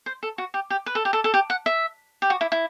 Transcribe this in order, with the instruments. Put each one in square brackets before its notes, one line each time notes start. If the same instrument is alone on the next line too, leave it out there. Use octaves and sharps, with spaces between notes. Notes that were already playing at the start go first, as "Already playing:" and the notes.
[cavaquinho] C5
A4
F#4
G4
G4
B4
A4
G4
A4
A4
G4
F#5
E5
G4
F#4
E4
E4